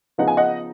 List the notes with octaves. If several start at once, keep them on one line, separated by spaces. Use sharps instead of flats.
C#3 F3 B3 D#4 F#5
G#5
D#5 F#5